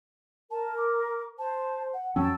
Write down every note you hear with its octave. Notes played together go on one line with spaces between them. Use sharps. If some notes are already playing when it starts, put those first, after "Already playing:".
A#4 A5
D6
C5 A5
F#5
F2 F#3 C#4 G5 A5 E6